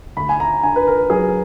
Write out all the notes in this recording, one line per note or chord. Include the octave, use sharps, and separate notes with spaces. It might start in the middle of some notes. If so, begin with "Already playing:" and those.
D2 B5
G#5
A#5
D3 G#5
B4
A#4
F#3 G#4